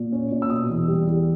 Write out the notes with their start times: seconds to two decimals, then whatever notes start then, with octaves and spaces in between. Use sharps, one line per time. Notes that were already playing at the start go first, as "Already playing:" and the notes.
Already playing: A#2
0.12 C#4
0.32 A#2
0.42 E6
0.50 B2 D#6
0.69 E2
0.88 G3
1.07 E2